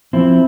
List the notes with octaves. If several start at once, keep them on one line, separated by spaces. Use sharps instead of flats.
F3 C4 E4